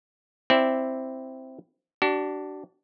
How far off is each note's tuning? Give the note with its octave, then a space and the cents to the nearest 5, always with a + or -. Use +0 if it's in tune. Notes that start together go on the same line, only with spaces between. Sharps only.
C4 +0 E4 +0 D5 +0
D4 +0 F#4 +45